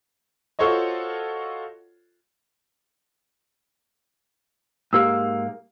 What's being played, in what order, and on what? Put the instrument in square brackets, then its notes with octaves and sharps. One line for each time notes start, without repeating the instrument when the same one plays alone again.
[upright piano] F4 F#4 A4 C5 C#5 D#5
[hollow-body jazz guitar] G#2 A#3 [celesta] G4 E6